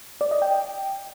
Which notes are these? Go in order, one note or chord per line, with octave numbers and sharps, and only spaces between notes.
D5
D#5
G5